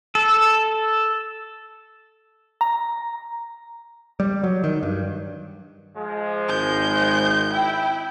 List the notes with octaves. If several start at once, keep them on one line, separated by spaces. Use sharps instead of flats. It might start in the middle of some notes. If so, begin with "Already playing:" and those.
A4
A#5
G3
F#3
D#3
G2
F3 G#3
G#1 G6
E4 G5